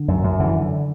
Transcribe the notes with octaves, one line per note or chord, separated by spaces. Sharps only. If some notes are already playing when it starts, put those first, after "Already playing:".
Already playing: D3
F#2
F#2
D3 E3
D3